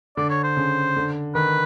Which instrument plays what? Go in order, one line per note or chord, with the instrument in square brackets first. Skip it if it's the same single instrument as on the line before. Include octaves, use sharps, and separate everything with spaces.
[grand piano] D3 [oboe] D5
[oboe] C#5
C5
[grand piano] C#3
D3
[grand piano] D#3 [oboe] B4